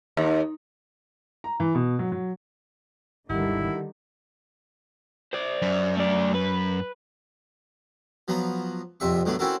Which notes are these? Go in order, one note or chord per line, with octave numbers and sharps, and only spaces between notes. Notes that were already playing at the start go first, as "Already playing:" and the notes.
D#2
A#5
E3
B2
F#3
F#3
G#1 D#2 D3 D#3 G3 E4 G4 F#5
C5 D5
F#2
A3 D5
B4
F3 F#3 B3 A#5
A#1 F2 C3 E5 C#6
A2 D3 F#3 A3 B3
C4 C#4 E4 F#4 A4 A#4